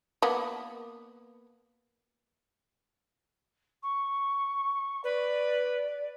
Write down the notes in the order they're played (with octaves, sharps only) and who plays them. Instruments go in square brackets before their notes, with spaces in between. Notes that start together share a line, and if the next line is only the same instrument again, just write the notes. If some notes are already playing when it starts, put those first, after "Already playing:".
[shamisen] A#3 B3
[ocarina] C#6
[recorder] B4 [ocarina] D5